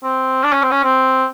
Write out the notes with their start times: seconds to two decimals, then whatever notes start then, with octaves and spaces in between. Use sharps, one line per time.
0.04 C4
0.44 D4
0.53 C#4
0.63 C4
0.71 C#4
0.83 C4